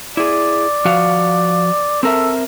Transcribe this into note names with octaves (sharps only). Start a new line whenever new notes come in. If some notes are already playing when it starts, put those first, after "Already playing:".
E4 G#4 D5
F3 F#4 F5
C4 A4 A#4 E5